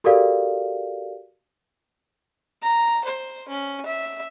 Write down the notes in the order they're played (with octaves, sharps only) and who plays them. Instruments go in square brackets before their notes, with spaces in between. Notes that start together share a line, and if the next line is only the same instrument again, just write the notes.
[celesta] F#4 G4 A4 A#4 D5 F5
[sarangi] A#5
C5
C#4
E5